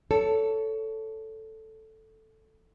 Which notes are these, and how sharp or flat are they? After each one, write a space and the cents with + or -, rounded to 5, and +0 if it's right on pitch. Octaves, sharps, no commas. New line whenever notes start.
A4 +0 C#5 +25